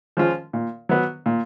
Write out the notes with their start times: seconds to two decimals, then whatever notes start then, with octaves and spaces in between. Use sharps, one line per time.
0.17 F3 G#3 C#4 F4
0.53 A#2
0.89 F#3 B3
1.26 A#2